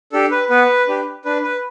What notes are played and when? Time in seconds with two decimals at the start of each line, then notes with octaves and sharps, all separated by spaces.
0.12 D4 G4 A4
0.31 B4
0.50 B3 B4
0.88 D4 G4
1.25 D4 B4
1.44 B4